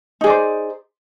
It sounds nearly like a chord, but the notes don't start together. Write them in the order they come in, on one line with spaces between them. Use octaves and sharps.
D#4 G#4 D5 C5